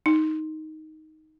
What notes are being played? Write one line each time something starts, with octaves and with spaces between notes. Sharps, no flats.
D#4